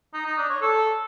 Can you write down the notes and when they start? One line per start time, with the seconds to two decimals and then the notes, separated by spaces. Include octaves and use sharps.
0.14 D#4
0.26 D#4
0.38 D4
0.50 C#5
0.61 A4